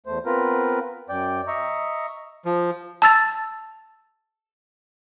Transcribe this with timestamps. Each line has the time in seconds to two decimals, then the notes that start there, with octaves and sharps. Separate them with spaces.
0.06 E2 A3 C5
0.26 B3 C4 F4 A#4 B4
1.09 F#2 D5 G5
1.47 D#5 E5 A#5 C#6
2.45 F3
3.02 A5 E6 A6